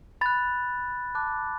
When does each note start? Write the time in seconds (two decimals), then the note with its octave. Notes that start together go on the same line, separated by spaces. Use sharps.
0.21 B5 F#6 A6
1.15 A5 D6 F#6